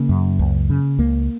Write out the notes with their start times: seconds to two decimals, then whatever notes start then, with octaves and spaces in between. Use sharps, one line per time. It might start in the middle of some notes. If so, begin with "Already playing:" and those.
Already playing: C#3 A#3
0.09 F#2
0.39 C#2
0.70 C#3
0.98 C#2 A#3